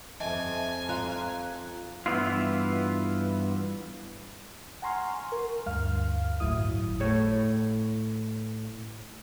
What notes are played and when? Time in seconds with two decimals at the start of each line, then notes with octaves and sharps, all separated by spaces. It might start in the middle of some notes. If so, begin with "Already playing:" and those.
0.20 F2 D#5 E5 G#5 A5
0.89 F4 A#5 F#6
2.06 G2 E3 B3 E4 F4
4.82 F#5 G#5 A#5 C6 C#6 F6
5.32 A#4
5.66 D2 G2 F5 F6
6.40 G1 D#2 A2 F#3 E4 D#6
7.00 A2 C#5